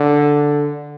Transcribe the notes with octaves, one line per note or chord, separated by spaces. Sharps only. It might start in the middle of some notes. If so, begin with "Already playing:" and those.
Already playing: D3